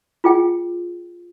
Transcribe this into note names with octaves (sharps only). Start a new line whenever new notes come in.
F4 G#4 G5